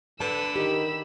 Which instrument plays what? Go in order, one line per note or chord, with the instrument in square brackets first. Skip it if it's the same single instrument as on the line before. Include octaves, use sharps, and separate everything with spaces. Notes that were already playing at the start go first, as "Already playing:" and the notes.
[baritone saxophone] D3 [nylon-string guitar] B4 A5 [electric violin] B5 E6
[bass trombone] D#3 [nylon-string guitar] G4